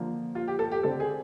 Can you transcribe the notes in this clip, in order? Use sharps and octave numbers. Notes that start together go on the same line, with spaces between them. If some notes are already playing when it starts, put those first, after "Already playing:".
Already playing: D3 F3 A#3
F4
G4
A4
G4
D3 G3 C4 A4
G#4